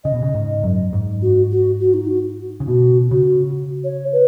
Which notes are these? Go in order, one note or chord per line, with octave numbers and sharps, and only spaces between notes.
C#3 D#5
B2
C#3
G#2
F#2
G#2
F#4
F#4
F#4
D#4
F#4
C#3
B2 F#4
C#3 F#4
C#5
B4